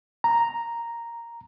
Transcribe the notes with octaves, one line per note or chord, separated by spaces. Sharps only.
A#5